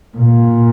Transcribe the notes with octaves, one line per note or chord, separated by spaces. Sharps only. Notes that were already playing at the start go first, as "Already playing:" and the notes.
A#2